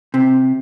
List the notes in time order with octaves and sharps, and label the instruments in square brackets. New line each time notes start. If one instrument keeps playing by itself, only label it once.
[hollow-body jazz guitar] C3